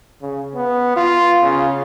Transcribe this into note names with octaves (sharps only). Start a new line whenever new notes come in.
C#3
B3
F4
C#3